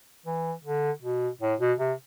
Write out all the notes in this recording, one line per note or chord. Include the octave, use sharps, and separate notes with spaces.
E3
D3
B2
A2
B2
C3